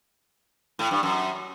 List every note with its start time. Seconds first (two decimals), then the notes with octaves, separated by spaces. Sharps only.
0.79 A2
0.91 G2
1.03 F#2